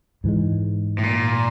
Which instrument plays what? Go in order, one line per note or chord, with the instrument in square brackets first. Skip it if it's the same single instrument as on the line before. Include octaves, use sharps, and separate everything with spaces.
[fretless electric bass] G#2 E3 G#3
[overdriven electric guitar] A2
A#2